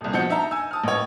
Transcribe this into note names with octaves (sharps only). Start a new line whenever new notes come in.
D#1 C2
B2 F3 F#4 D#5 G6 C#7
D#4 E5 A5 A#5
G#5 E6
A5 D#6 F6
A1 C#5